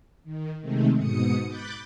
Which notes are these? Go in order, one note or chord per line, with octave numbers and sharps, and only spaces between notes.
D#3
C3 D#3 G#3 A3 C4
G#2 B2 D#6 C#7
B5 D6 F#6 G6 A6